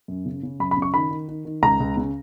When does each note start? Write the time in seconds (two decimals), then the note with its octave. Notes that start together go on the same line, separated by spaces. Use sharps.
0.08 F#2
0.26 C#3
0.43 C#3
0.60 F#2 B5
0.71 B5
0.77 C#3
0.82 C#6
0.94 D#3 B5
1.11 D#3
1.28 D#3
1.45 D#3
1.62 C#2 A#5
1.80 C#2
1.97 C#3